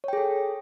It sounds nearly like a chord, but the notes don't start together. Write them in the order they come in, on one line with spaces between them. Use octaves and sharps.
C#5 G5 G#4 A4